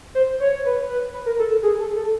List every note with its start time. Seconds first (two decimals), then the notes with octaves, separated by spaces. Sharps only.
0.15 C5
0.40 C#5
0.65 B4
0.89 B4
1.14 B4
1.26 A#4
1.39 A4
1.63 G#4
1.80 A4
1.96 A4